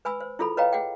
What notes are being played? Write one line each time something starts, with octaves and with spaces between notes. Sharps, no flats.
B4 G#5 B5 E6
C5
E4 F4 G#4 A4 B5
B4 C#5 D#5 F5 G5 A#5
G#4 F#5 G5